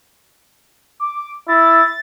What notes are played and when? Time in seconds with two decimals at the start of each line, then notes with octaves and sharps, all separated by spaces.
1.00 D6
1.48 E4 A6